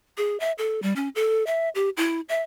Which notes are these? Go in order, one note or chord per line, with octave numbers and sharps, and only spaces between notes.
G#4
E5
A4
G3
C#4
A4
E5
G4
E4
E5